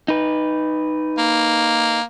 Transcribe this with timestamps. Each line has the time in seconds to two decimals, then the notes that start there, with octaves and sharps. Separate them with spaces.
0.08 D#4 B4
1.18 A#3